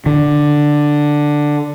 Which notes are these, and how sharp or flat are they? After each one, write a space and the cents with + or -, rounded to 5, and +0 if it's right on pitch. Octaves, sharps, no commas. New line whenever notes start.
D3 +5